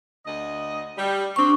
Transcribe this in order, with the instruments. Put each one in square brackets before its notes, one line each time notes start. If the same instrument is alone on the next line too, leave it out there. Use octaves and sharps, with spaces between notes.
[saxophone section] D2 D#5
G3
[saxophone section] C4 [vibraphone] D4 C#6